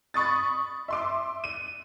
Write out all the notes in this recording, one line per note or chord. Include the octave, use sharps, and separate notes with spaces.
B5 C#6 D#6 A6
E5 C6 D6
D#7